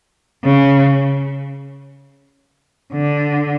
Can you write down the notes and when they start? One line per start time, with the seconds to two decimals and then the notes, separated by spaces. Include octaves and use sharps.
0.44 C#3
2.93 D3